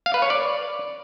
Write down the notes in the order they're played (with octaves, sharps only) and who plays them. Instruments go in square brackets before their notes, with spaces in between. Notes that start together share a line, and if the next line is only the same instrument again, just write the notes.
[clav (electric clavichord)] F5
B4
C#5
D5